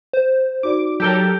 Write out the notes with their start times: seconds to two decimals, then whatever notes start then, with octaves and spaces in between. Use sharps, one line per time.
0.13 C5
0.63 D#4 F#4 D5 D6
1.00 F#3 G4 A4 A#4 G6 D7 G7